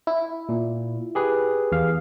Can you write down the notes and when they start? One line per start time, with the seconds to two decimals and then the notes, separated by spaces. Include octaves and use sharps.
0.07 E4
0.49 A#2
1.15 G4 G#4 B4
1.72 E2 F5